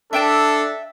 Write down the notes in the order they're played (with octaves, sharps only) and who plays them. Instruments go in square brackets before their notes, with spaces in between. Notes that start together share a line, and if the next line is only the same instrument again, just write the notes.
[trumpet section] D4 A4 [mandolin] E5 G5 A5